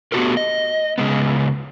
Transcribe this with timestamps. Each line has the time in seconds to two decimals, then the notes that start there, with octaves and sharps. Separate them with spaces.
0.12 A3 B3 D4 F#4 G4 A#4
0.37 D#5
0.98 C#3 G#3 B3